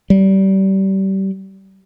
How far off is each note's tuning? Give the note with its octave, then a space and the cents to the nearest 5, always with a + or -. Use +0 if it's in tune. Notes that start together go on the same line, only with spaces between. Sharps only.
G3 -25